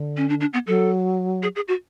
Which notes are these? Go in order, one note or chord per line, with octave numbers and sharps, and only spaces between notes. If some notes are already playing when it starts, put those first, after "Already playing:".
Already playing: D3
C#4
D4
D4
B3
F#3 A4
G#4
G#4
F#4